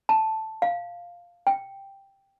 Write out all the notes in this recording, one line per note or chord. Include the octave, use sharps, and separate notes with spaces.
A5
F5
G5